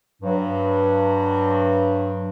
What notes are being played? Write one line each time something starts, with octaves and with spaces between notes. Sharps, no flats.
G2 F#3